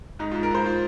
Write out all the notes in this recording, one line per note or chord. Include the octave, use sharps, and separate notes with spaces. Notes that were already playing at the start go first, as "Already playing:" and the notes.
G#2 D#4
F4
G#2
A#4
G#2 C5
F4